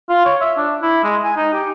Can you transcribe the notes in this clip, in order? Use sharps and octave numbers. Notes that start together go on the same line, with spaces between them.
F4
C#5
E5
D4
E4
G#3
G#5
D#4
G4